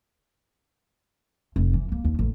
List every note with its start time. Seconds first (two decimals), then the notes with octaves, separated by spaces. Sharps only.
1.56 F1
1.74 E3
1.92 A#3
2.04 D#2
2.19 A1